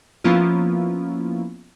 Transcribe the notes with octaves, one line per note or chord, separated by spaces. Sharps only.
F3 A#3 B3 C#4 E4 F4